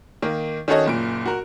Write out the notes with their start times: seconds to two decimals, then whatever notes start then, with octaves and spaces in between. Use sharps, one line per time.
0.22 D#3 A#3
0.68 D#3 C#4 F#4 A4 C#5 D#5
0.86 F#1 A#2 D7
1.26 F#4 A#4